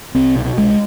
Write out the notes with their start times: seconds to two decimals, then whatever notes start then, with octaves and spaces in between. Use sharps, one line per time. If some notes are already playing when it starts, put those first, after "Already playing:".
0.15 C2 C4
0.36 B2
0.57 C2 G#3